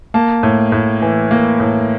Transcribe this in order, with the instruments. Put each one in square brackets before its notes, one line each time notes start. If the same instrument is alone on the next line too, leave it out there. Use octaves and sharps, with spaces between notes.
[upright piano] A#3 A5
A2
A2
E3
A#3
A2